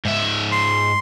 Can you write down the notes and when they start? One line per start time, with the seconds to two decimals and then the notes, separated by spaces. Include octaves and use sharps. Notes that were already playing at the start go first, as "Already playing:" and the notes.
0.05 G#2 E5
0.52 C6